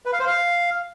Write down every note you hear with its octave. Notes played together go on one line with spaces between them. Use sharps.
B4
F5
C5
F5